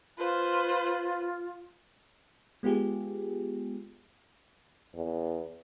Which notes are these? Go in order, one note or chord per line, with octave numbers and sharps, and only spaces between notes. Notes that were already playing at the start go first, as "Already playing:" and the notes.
F4 B4 C5
G#3 B3 F4 G4 G#4
E2